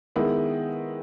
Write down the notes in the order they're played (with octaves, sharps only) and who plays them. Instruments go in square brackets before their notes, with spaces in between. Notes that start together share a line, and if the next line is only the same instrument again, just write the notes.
[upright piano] D#3 G#3 B3 E4